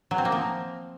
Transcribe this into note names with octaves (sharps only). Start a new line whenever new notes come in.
F#3
C4
A#3
F3